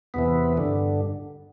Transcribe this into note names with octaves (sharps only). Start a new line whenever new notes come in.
E2 C3 E3 B3
G2 D3